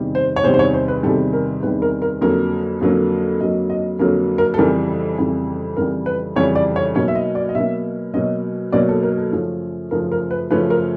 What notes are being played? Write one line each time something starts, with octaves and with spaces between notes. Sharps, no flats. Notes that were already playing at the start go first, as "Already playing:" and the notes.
Already playing: E2 C3 D#3 G3
C5
C#5
E2 C3 D#3 G3 C5
C5
C#5
C5
B4
E2 C3 D#3 G3 A4
A#4
E2 C3 D#3 G3 B4
A#4
A#4
F2 D3 F#3 A#3 C#4 A#4
F2 D3 F#3 A#3 C#4
F2 D3 F#3 A#3 C#4 D#5
D#5
F2 D3 F#3 A#3 C#4 A#4
A#4
A4
F2 C#3 E3 G3 A#4
A4
F2 C#3 E3 G3
F2 C#3 E3 G3 A#4
B4
F2 C#3 E3 G3 C#5
D5
C#5
B2 F#3 A#3 C#4 C#5
E5
D#5
D5
D#5
B2 F#3 A#3 C#4 E5
B2 F#3 A#3 C#4 D#5
B2 F#3 A#3 C#4 D5
A4
A#4
A4
F#2 C#3 F3 A3 C#4
F#2 C#3 F3 A3 C#4 A#4
A#4
B4
F#2 C#3 F3 A3 C#4 B4
A#4